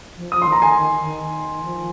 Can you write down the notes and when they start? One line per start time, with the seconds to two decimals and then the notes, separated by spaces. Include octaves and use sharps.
0.17 F3
0.32 F3 D#6
0.42 C6
0.47 D#3
0.52 A#5
0.62 G#5 C6
0.76 D#3
1.02 D#3
1.65 F3